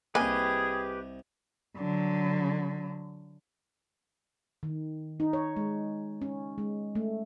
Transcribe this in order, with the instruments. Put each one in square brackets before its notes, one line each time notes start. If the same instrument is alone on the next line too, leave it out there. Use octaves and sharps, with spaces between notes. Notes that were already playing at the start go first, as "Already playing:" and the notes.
[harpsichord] C2 D#5 [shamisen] A#3 G#5 [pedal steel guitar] G4 B4 [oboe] G#4
[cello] D3 F#3
[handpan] D#3
D#4
C#5
G#3
C#4
G#3
A3